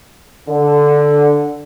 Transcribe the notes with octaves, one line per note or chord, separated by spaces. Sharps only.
D3